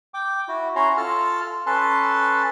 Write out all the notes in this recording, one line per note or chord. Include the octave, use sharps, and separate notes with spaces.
G5 D6
E4 F#4
C#4 E4 F#4 C#5 A#5 C6
F4 A4 A5 F6
C#4 A4 B4 A5 C6